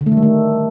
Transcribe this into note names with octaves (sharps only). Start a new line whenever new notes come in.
D3
A3
D#3
G3
A3